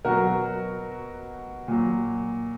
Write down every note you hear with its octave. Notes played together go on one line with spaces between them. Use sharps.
B2 F#3 F#4 A#4
A#2 F#3